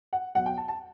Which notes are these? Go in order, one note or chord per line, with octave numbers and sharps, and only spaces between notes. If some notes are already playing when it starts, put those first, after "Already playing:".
F#5
E2 B2 F#3 F#5
G5
A5
A5